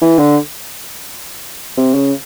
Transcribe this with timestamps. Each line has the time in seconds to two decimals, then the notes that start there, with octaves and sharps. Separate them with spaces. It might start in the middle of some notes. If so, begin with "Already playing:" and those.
0.02 E3
0.19 D3
1.77 C3
1.94 C#3